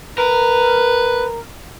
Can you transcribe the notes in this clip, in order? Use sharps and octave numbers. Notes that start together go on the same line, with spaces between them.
A#4 B4